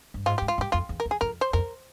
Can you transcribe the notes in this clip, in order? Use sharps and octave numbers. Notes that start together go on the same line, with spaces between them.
G2
G#2 F4
G#2 G4
F4
G2
G4
F2 F4
E2
A#4
F2
G#4
F2 A#4
C5
F2 A#4